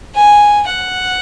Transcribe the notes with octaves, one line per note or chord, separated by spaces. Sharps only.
G#5
F#5